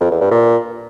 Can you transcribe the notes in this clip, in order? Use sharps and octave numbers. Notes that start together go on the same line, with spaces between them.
F2
E2
G2
A#2